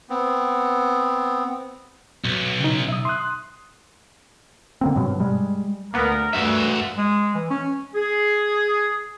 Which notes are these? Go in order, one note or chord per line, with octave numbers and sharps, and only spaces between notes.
B3 C4
B1
C#3 D#4
E5 D#6
C6 D#6 F#6
D3 A#3 C4
G2 B2 F#3
G3 G#3
D2 A#3 B3 A#4
G2 A#2 E3 A3 F#4 E5
G#3
E3
C#4
G#4